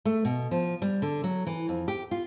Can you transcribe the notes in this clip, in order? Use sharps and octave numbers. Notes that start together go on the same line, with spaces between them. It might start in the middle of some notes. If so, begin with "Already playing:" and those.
A3
B2
F3
G3
D3
F#3
E3
F2
G4
F4